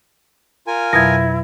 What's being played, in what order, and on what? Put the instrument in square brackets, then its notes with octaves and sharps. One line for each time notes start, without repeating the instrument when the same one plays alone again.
[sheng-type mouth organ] F4 A#4 G#5
[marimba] F2 B2 F#3 [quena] E4 [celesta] G#6 A#6